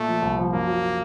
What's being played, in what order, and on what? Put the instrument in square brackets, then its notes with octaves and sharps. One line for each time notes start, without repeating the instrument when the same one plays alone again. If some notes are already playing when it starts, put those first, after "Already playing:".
Already playing: [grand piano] A#2 [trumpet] A3
[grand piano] F3
C2
F3
[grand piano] F#2 [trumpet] A#3
[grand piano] F#3